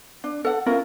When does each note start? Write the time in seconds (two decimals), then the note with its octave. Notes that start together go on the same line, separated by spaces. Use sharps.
0.24 D4
0.45 A4 F#5
0.66 C#4 E4 F4 A#4